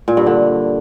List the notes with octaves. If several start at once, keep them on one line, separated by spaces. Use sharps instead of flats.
A#2
G2
D3